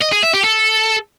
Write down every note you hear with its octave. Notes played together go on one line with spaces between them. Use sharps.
D#5
G#4
E5
G4
A4